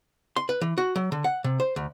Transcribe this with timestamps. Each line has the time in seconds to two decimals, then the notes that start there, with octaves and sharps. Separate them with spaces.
0.36 C6
0.49 B4
0.61 E3
0.78 F#4
0.96 F#3
1.12 D3
1.24 F#5
1.44 C3
1.60 C5
1.76 D2